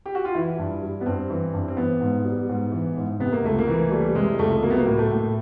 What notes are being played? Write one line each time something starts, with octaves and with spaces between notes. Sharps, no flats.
G4
F#4
F4
E3 E4
G2
G3
B3
G2 C4
E3
G2
C4
E3 B3
G#2
G3
G#2
E3
G#2
C3 B3
A#3
C#2 A3
A#3
E3
G3 A3
C3 G#3
C#2 A3
F#3 A#3
B3
A#3
A2
A3
A2